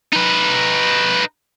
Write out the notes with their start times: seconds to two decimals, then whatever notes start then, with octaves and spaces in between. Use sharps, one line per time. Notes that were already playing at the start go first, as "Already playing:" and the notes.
0.13 D#4 B4